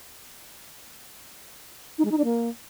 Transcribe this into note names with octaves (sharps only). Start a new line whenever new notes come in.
D#4
G#3
D#4
D4
A#3